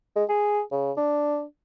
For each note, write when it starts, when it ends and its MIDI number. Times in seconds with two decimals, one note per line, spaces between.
0.16 0.24 56
0.29 0.62 68
0.72 0.92 49
0.97 1.43 62